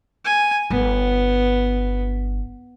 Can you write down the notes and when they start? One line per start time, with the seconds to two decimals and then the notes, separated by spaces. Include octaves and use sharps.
0.24 G#5
0.70 G1 B3